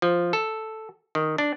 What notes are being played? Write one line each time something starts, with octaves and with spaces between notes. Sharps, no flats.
F3
A4
D#3
D4